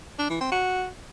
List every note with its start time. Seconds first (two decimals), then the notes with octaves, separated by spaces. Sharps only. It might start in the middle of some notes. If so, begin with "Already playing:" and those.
0.19 D4
0.30 E3
0.41 C4
0.52 F#4